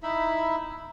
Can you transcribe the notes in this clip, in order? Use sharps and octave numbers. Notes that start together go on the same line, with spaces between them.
D#4 E4 E5 B5